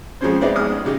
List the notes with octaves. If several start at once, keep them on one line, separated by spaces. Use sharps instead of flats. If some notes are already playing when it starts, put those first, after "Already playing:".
F2 F3 G#3 C4 C#4 C5
G#3 B3 C4 D#4 D5 E5
A1 G#3 D#6 F6
C#3 D#4 G4